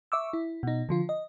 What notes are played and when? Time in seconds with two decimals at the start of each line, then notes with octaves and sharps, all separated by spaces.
0.12 E5 C#6 D6 E6
0.33 E4
0.63 B2 D#4
0.89 D3 F3 F4
1.09 D#5